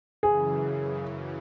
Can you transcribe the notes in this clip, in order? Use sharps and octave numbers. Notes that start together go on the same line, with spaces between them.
F#2 C#3 E3 G#4